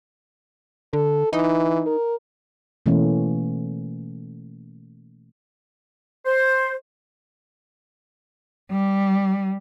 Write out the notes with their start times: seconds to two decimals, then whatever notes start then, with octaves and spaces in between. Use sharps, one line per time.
0.93 D3 A4
1.33 E3 D#4
1.86 A#4
2.86 B2 E3 A3 A#3 C#4
6.26 C5
8.71 G3